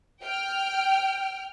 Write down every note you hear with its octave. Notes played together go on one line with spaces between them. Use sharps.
G5 F6